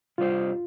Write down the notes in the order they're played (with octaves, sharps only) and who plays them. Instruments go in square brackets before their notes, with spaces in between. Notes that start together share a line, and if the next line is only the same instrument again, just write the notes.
[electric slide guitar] C3 G3 D4 G4 C5 [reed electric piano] F4